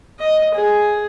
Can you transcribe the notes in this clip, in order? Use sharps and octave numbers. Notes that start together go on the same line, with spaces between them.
D#5
G#4